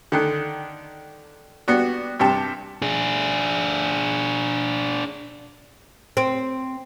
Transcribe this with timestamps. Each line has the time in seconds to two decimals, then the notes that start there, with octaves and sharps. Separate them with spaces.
0.12 D3 D#3 F#6
1.68 G3 B3 D4 F#4
2.20 G2 C3 G4 A5
2.82 D4 G#4
6.17 C4